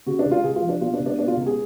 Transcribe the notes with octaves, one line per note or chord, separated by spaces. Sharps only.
C#3 F#4
D4
C#2
F4
C#2 G#4
F4
F3
D4
B2 F4
D4
C#2
D4
B2 D4
F4
C#2
G#4